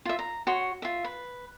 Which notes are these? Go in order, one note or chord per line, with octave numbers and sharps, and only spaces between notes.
F4 E5
A#5
F#4 C#5 C6 C#6
F4 E5
B4